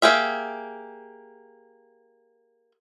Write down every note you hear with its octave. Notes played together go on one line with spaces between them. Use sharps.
A#3 G4 G#4 E5